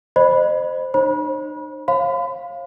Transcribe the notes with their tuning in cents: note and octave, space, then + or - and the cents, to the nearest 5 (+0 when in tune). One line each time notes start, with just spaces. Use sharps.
C5 +0 D#5 -35 B5 +0
D#4 -45 C5 +35 B5 -40
C#5 -45 F5 +0 B5 +45